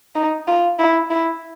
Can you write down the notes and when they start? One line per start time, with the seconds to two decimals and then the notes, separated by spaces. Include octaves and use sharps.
0.15 D#4
0.48 F4
0.79 E4
1.10 E4